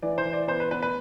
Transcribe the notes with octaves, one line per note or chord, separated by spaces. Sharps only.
E3 D5
C5
E3
D5
B3 C5
B4
B3 B4
B4